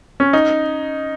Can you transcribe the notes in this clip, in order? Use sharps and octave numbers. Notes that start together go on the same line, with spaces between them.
C#4
D#4